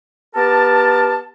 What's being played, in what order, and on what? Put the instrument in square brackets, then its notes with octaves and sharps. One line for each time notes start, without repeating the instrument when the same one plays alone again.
[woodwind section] B3 G4 A#4 A5